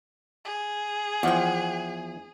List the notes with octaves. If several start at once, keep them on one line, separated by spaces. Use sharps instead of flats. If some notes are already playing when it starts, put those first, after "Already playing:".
G#4
E2 F3 F#5 G5